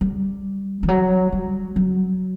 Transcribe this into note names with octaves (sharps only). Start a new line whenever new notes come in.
G3
E3
F#3
G3
F#3